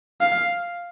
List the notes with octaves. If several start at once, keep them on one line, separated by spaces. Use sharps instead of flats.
F5